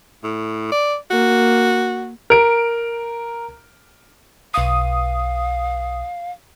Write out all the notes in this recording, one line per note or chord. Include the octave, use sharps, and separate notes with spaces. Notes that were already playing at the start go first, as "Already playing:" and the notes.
A2
D5
A#3 F#4
A#4 D7
B1 F5 D#6